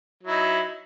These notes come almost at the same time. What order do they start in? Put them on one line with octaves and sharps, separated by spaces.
F#3 E4 D#4